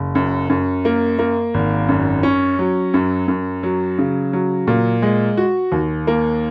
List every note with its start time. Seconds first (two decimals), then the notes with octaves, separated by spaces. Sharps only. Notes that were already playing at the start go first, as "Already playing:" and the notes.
Already playing: F#1
0.15 F#2
0.50 F#2
0.85 A#3
1.19 A#3
1.54 G#1
1.89 F#2
2.23 C#4
2.59 F#3
2.94 F#2
3.28 F#2
3.63 F#3
3.98 C#3
4.33 F#3
4.67 A#2
5.02 G#3
5.37 F#4
5.72 D#2
6.07 A#3